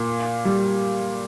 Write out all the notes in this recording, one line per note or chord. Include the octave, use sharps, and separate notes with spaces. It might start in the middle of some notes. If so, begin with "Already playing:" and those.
Already playing: A#2 A#3
G3